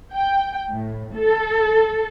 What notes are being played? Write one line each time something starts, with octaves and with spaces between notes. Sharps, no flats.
G5
A2
A4